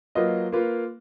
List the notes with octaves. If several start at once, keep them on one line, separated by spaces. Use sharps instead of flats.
F#3 A#3 F4 B4 D#5
A#3 F4 B4